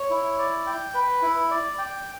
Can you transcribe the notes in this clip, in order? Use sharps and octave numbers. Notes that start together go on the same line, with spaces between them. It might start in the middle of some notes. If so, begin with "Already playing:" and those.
Already playing: C#5
E4
D5
G5
B4
E4
D5
G5